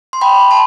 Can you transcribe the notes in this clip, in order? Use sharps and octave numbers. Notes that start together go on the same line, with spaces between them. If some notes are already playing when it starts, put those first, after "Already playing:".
C6
G5 B5
A5 C6